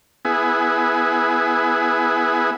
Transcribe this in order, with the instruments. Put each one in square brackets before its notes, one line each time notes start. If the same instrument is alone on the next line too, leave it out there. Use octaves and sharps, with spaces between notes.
[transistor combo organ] B3 E4 G#4